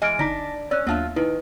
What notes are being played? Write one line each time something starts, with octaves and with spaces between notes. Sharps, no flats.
E3 G#3 D#5 G#5 F6 D7
G1 D4 D#4 D6 A#6 B6
C#4 D5 E6 F#6
D#2 F#3 B3 D4 F4 E5
D#3 D#4 E4 B4